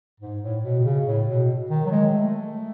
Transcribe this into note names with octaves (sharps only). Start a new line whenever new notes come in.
G#2
A2
B2
B2
C#3
A2
B2
D#3
F#3
G#3
A3